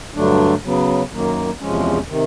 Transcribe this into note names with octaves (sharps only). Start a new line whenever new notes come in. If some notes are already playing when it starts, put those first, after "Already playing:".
G2 D3 F#3 A3 D4
C#3 F#3 B3
F#2 D#3 F#3 A#3
E2 C3 F3 G#3 C#4
C3 D#3